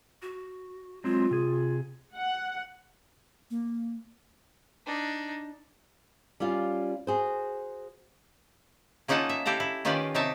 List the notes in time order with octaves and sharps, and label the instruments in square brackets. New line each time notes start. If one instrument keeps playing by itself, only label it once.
[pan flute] F#4
[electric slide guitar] F#3 G#3 C4 [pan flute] F4
[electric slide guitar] C3 G#4
[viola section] F#5
[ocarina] A#3
[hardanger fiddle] D4 D#4
[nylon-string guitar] G3 C#4 F4 F5
F#4 G#4 C5
[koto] A#3 C#4 D#4 F4 F#5 A5
E5
E4 G4 A4 F5 A#5
E4
D#3 C#4 F4 G4 B4 D5
C3 C4 D#4 C#5 E5 A5